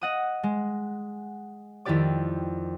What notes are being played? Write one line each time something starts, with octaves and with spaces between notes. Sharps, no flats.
D#5 F#5 D#6
G#3
F2 D#3 E4 G4 D5 D6